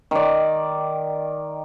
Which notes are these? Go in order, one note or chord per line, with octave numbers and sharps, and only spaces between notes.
D#3 D5